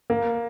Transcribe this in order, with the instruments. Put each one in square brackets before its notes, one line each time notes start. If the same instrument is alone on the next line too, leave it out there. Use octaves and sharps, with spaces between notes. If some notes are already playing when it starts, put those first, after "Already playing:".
[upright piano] A#3